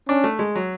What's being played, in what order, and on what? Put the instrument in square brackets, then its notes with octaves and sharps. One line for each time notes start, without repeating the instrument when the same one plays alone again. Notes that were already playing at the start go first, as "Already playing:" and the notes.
[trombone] C#4 [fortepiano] D4
[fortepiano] A3
G#3
F#3